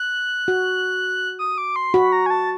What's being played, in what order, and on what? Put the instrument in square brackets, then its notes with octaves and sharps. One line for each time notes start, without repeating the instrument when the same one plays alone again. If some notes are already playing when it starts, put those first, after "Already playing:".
Already playing: [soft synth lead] F#6
[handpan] F#4
[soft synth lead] D#6
D6
C6
[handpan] F#4 [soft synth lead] B5
[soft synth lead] A#5
G#5
A5